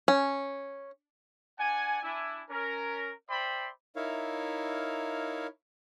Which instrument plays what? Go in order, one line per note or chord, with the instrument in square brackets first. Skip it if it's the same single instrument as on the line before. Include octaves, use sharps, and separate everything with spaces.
[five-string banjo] C#4
[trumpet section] D4 D5 F#5 G#5
D4 E4 G#5
C#4 A#4
C5 D5 E5 G5 B5 C6
[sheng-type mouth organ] D#4 E4 A#4 C#5 E5 F5